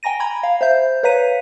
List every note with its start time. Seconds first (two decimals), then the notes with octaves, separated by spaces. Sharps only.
0.03 G5 G#5 A#5 A#6 D#7
0.20 A#5 B5 G#6
0.43 F5
0.61 C5 E5 G6
1.03 B4 C#5 F5 A#5 B6 D#7